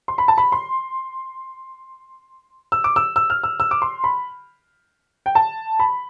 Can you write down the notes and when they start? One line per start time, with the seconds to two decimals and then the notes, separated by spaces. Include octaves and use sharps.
0.08 C6
0.18 B5
0.28 A5
0.38 B5
0.52 C6
2.72 E6
2.84 D6
2.96 E6
3.16 E6
3.30 F6
3.43 E6
3.60 E6
3.71 D6
3.82 C6
4.04 B5
5.26 G5
5.35 A5
5.80 B5